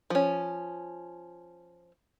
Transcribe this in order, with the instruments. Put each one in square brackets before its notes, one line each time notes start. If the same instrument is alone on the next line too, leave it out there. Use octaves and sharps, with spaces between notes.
[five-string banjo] F3 C#4